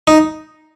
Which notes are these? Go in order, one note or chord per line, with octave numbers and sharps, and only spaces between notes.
D#4